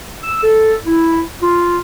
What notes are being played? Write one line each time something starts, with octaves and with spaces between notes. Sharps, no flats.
E6
A4
E4
F4